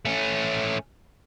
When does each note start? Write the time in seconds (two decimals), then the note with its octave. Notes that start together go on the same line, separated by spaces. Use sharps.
0.05 A3 C#4